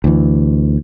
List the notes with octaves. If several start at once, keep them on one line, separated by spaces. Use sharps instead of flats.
D2 E3